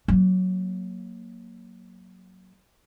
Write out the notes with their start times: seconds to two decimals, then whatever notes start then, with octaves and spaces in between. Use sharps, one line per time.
0.08 F#3 A#3